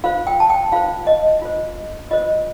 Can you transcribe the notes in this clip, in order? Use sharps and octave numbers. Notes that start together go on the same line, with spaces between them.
F4 C5 F5
G5
A5
G5
F4 C5 F5
D#5
F4 C5
F4 C5 D#5